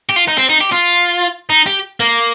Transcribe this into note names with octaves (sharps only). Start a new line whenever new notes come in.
G4
F4
D#4
C4
D#4
G4
F4
D#4
G4
A#3